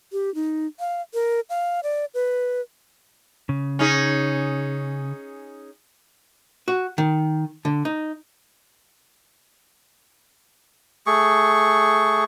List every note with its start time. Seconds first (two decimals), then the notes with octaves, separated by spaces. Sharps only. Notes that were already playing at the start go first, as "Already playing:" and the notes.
0.12 G4
0.35 D#4
0.80 F5
1.14 A#4
1.50 F5
1.83 D5
2.14 B4
3.49 C#3
3.79 C#4 D#4 G#4
6.68 F#4
6.98 D#3
7.65 D3
7.85 D#4
11.07 A3 G#4 C#6